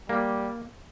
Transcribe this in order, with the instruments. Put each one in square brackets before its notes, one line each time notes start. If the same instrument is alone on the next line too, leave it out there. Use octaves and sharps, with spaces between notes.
[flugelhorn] G3 [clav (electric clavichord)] A#3